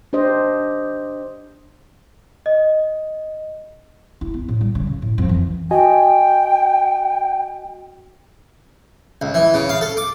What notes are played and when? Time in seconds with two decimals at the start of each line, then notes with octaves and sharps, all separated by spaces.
0.13 D4 G4 C5 D#5
2.46 D#5
4.21 E4
4.34 B3
4.48 A2
4.61 G3
4.75 C#3
4.87 C#3
5.02 A2
5.18 F2
5.29 E3
5.71 F#4 D#5 G5 G#5
9.22 C#2
9.34 E3
9.54 C#3
9.69 F5
9.81 A4
9.97 D6